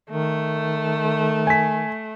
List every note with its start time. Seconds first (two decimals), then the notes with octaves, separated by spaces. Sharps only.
0.10 D#3 A3
1.47 G#5 B6